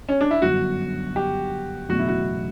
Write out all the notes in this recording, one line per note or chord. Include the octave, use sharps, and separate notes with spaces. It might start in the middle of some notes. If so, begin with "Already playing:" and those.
C#4
D4
E4
G1 F#2 D3 F#4
G4
F#1 E2 B2 A3 F#4
E4
F#4